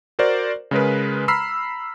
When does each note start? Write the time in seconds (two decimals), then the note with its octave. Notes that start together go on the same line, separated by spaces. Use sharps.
0.19 F#4 A#4 C5 D5
0.71 C#3 G#3 A#4 B4
1.28 A#5 B5 E6 F6 B6 C7